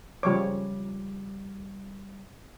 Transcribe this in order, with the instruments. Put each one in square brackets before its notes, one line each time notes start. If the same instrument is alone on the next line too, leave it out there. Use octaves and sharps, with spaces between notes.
[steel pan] C#3 F3 C#5 [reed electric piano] G3 D6